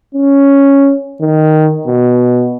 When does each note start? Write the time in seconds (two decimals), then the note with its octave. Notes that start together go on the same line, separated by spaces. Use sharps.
0.15 C#4
1.21 D#3
1.87 B2